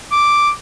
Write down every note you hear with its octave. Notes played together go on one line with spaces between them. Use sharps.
D6